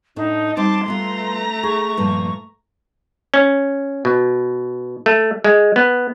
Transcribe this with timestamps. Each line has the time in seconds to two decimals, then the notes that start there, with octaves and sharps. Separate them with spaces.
0.16 A2 A3 D4 D#4
0.57 G3 C4 D#4 A5 C6 D6
0.86 G3 A3 B3 F4 A#5
1.63 G#4 C#6
1.97 G2 A#2 F3
3.34 C#4
4.05 B2
5.06 A3
5.44 G#3
5.76 B3